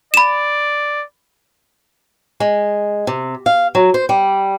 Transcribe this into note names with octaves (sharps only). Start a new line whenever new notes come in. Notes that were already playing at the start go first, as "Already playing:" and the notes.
D5 B5 E7
G#3
C3
F5
F#3
C5
G3